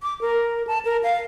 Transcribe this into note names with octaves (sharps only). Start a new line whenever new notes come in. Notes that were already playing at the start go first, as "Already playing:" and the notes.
D6
A#4
A5
A#4
F5